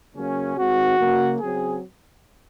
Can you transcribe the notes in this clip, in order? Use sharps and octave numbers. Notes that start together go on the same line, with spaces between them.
C#3 F#3 A#3 C#4
D#3 G#3 C4 F#4
C#3 F#3 A#3
C#3 F#3 C4 G#4